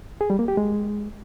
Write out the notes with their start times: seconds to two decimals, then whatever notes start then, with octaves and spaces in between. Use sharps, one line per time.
0.21 G#4
0.30 G3
0.39 A#3
0.48 G4
0.57 G#3